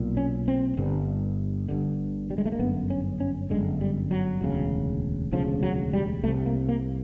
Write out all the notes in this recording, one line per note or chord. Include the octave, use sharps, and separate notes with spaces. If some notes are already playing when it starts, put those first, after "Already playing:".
Already playing: B1 A#2
C#4
C4
G1 G2 D3
G1 G2 D3
G3
G#3
A3
A#3
G1 F#2 D3 B3
C#4
C#4
G1 F#2 D3 G#3
G3
F#3
E1 D2 C#3
E1 D2 C#3 F3
F#3
G3
C2 C3 A3
A#3
A#3